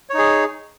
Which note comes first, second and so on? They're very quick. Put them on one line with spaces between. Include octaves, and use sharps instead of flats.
C#5 D#4 G#4